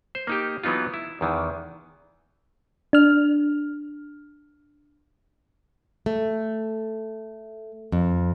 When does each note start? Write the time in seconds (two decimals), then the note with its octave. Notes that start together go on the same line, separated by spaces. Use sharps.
0.15 C5
0.27 A#3 D#4 G4
0.64 E3 F#3 B3 D#4 F4
0.94 E4
1.21 E2 D#3 E3
2.93 D4 F6
6.06 A3
7.92 F2